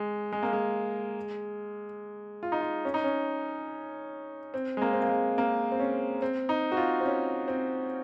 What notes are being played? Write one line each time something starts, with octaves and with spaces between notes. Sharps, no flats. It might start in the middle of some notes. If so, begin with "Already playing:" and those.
Already playing: G#3
G#3
A#3
G#3
F4
D#4
F4
C#4
D#4
C#4
C4
G#3
A#3
C4
A#3
G#3
A#3
C4
C#4
C4
D#4
F#4
F4
C4
C#4
C4